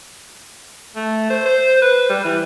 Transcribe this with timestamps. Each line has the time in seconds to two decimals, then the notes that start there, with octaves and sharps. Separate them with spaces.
0.96 A3
1.30 C5
1.46 C5
1.82 B4
2.10 G3
2.24 E3